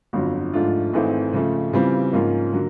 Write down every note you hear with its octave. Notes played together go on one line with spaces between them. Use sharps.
G1 F2 D3 F#3
G#2 F3 A3 D4 F4
G#1 G#2 E3 A3 C4
C#3 F3 A3
C#3 E3 G3 C4 F4
G#2 F3 A#3 C#4 F4
D3 F#3 A#3